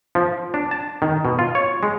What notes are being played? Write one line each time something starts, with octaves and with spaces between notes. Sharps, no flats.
F3
D4
A5
D#3
B2
F4
C#5
G#3